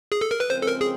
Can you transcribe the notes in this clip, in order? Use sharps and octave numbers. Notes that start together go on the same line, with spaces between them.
G#4
A4
A#4
B4
C#3 F3 G#3 C4 C5
A4
A#4
G#4